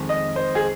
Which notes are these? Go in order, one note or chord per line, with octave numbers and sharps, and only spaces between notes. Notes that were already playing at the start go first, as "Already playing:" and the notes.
Already playing: F2 D#3 G#3
D#5
C5
G#4